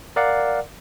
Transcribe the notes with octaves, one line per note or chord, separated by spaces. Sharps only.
A#4 D5 F5 F#5